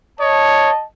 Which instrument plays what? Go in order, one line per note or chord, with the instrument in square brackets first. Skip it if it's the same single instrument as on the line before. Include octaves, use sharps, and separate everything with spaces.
[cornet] C#5 [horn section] D#5 A5